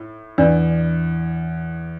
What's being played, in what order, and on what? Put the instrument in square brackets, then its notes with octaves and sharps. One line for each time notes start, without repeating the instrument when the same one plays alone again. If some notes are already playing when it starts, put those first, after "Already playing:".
Already playing: [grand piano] A2
[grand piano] E2 E3 [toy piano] D4 B4 D5